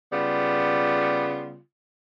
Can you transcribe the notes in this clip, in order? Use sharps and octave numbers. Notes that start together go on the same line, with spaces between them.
C#3 G3 B3 F4